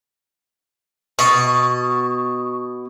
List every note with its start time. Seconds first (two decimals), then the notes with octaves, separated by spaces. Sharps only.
1.19 B2 C#6 D#6